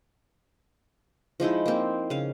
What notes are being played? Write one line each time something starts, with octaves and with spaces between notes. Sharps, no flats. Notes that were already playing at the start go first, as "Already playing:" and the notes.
F3 G#3 D#4 E4
A#3 C4
C#3 F5